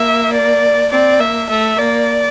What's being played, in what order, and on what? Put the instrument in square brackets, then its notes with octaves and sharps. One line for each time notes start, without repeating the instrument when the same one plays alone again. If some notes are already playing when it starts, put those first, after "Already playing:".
Already playing: [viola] A#3 [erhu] E5
[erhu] D5
[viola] C4 [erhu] D5
[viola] A#3 [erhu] E5
[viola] A3 [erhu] E5
[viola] A#3 [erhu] D5